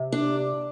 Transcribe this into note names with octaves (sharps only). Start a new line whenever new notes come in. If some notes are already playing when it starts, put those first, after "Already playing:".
Already playing: C3
D4